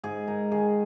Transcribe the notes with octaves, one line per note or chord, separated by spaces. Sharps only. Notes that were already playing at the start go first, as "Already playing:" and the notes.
G#2 G#4
G#2 A#4
D#3 G#4